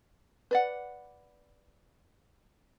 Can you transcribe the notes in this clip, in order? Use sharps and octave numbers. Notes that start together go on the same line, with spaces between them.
B4 D5 F#5